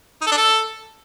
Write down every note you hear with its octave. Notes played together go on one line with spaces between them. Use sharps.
D#4
A4
D4
A4